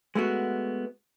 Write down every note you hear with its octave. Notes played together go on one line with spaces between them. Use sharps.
G#3 A3 B3 F#4